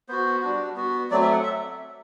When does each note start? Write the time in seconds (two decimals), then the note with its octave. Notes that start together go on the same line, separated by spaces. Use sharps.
0.08 B3 F#4 C5
0.42 G3 D4 F#4
0.76 B3 F#4
1.11 F#3 A3 C4 D5
1.22 E5
1.32 F#5
1.43 E5